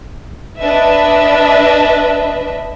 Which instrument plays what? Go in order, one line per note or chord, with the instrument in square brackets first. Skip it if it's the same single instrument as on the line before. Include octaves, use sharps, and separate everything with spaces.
[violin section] D4 B4 D#5 E5